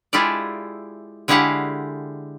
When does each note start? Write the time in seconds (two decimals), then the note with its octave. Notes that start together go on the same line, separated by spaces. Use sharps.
0.13 G#3 E4 F4 G4 A4 D5
1.28 D3 G#3 E4 G4 F5 F#5